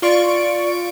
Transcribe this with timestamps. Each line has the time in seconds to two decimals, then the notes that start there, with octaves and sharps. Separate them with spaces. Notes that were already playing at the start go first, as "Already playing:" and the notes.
0.02 F4 D5 C#6 D7